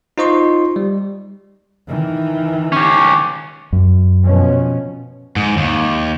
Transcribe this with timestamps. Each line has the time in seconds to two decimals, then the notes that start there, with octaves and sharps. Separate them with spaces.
0.18 D#4 F4 C5 D#5 C6 C#6
0.76 G3
1.88 D#3 E3
2.72 C#4 G4
3.73 F#2
4.24 B2 F3 C#4
5.36 G#2
5.57 D#2